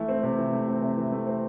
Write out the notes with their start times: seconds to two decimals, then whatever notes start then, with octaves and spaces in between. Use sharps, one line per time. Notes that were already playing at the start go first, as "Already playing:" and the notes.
Already playing: E3 A3
0.09 C4
0.23 C3
0.38 E3
0.53 A3
0.68 C4
0.82 C3
0.97 E3
1.12 A3
1.27 C4